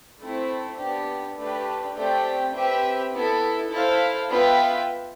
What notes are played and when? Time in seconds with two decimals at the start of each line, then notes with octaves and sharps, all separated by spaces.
0.20 A3 C4 E4
0.78 B3 D4 G4
1.37 A3 D4 G4 B4
1.95 A3 C4 G4 D5 G5
2.53 C4 G4 B4 E5 G5
3.12 B3 E4 A4
3.70 E4 A4 C5 F5
4.29 B3 F4 B4 E5 G5